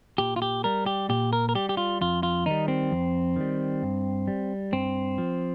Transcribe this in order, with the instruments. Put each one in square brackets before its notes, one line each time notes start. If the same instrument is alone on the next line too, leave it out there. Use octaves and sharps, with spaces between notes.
[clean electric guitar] A#2 G4
F4
G4
G3 A#4
G4
A#2 G4
A#4
A#4
G3 G4
G4
F4
F2 F4
F4
D#3 G3 D#4
C4
F2
D#3 G3
G2
G3
G2 C4
F3